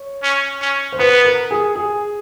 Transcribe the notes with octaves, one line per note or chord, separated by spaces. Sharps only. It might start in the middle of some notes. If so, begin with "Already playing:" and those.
Already playing: C#5
C#4
C#4
C5
B3 B4
A#4
G#4
G#4